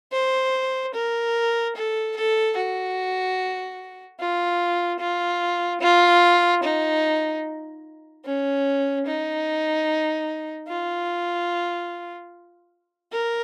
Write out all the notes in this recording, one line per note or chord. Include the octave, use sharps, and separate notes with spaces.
C5
A#4
A4
A4
F#4
F4
F4
F4
D#4
C#4
D#4
F4
A#4